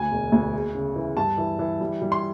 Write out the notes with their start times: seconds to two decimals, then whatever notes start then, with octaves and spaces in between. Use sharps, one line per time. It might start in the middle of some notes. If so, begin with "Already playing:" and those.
Already playing: D2 G#5
0.11 E1
0.32 D2
0.53 G#3
0.75 C#3
0.96 E3
1.17 G2 A5
1.38 E3
1.59 E3
1.80 G3
2.02 G3
2.12 C6